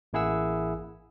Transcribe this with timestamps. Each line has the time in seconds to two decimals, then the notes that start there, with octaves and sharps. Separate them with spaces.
0.13 A1 A#3 E4 G#4 F#5 E6